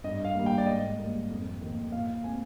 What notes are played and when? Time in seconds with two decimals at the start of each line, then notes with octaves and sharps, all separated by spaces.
0.04 G2 D#5
0.25 F5
0.35 D#3 G3 A#3
0.46 G5
0.58 D5
0.66 G#2 D#5
0.98 G3 A#3
1.30 F2
1.61 D#3 A#3
1.92 A#2 F5
2.24 G#3 C4 G#5